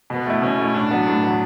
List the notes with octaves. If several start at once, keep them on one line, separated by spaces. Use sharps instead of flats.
B2 B3
A3 E4
B2 C#4
A3 E4
A2 D4
F#3 B3
A2
F#3 B3